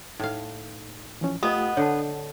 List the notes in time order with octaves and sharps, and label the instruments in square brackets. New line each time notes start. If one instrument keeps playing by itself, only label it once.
[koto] A2 F5 [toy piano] D#4
[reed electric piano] E3 F3 C#4
[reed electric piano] A3 F4 G4 [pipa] B3 [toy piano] A4 D#5 D#6
[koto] D3 [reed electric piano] D4 [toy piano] C#5 F#5 A5